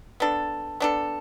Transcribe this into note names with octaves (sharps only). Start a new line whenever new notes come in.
B3 D4 A4
B3 D4 A4